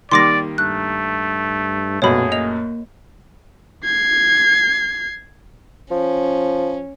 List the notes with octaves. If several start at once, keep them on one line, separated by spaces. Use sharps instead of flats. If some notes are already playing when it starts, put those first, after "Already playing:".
D#3 G3 A#3 D5 C6 D6 A#6
G2 A3 F#6
A#1 F#2 B2 A3 G#4 C#5 B5
A#3 D#5 F7
G#6 C7
F3 C#4